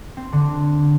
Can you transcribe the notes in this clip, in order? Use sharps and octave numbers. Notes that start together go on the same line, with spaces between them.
C4
D3